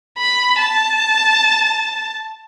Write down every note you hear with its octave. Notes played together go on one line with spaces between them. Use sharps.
B5
A5